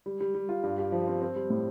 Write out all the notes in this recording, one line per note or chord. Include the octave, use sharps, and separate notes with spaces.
G3
G3
G3
F4
G2
G4
F3
C4
C4
G3
A2